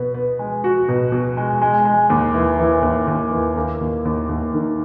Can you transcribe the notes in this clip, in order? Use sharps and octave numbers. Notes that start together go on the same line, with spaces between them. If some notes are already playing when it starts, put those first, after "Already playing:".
Already playing: B2 B3
B3
G#3
F#4
B2
B2
G#3
G#3
G#3
D#2
E3
E3
D#2
D#2
E3
A#3
D#2
D#2
D#2
D#3